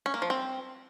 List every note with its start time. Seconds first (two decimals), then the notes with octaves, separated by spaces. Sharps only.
0.06 C#4
0.14 A#3
0.22 F3
0.30 C4